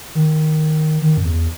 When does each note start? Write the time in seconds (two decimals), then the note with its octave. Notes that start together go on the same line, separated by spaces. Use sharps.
0.15 D#3
1.02 D#3
1.17 F#2
1.25 E2